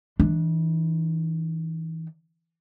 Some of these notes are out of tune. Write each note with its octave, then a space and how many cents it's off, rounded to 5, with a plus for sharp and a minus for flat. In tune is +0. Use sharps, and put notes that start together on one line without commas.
E3 -30 D4 +15